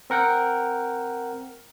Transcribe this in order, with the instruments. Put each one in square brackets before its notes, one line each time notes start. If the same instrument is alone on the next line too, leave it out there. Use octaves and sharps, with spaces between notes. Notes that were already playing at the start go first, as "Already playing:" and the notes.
[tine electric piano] C4 A#4 F#5 G5